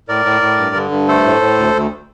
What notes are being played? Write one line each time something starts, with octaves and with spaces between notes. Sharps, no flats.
A2 A#4 D5
A2
A2
G2
D3
G2
A3 A4 C5
A2
A2
D2
D2